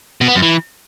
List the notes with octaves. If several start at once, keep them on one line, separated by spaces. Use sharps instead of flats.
B2
B3
F#2
E3